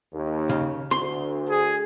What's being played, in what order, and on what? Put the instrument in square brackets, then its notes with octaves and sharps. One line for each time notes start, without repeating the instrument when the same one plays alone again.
[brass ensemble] D#2
[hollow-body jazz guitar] C#3
[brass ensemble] D2 [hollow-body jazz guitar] C6
[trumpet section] G#4